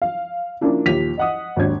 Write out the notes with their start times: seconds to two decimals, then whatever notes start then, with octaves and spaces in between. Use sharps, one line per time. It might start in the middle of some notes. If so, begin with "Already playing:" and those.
0.02 F5
0.61 F3 A#3 C#4 D4 E4
0.86 D#2 A#2 G4 B6 F7
1.18 D#5 F#5 D#6
1.56 G#1 D#2 D4 G#6